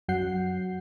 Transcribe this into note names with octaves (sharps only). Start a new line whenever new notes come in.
F#2 F#3 F#5 G6 C7